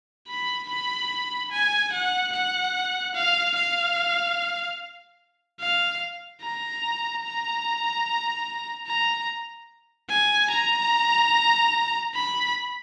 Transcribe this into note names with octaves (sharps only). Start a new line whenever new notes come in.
B5
B5
G#5
F#5
F#5
F5
F5
F5
A#5
A#5
A#5
G#5
A#5
B5